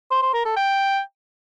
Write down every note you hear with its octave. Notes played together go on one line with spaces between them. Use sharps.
C5
C5
A#4
A4
G5